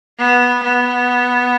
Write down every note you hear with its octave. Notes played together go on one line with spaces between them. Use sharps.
B3
B3